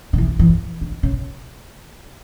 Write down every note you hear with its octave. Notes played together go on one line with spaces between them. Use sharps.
D3
E3
E3
D3
C#3